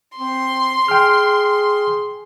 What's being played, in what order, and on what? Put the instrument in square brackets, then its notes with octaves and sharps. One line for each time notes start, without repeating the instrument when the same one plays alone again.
[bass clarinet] C4 [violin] C6
[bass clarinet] G#4 [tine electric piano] G5 F6